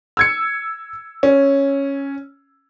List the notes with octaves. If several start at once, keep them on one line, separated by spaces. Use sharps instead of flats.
E6 G#6 C#7
C#4